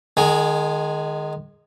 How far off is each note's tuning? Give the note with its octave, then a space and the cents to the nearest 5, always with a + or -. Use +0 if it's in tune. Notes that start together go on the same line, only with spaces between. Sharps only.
D#3 -30 G#3 +0